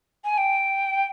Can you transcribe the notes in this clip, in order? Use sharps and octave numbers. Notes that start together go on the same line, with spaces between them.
G#5
G5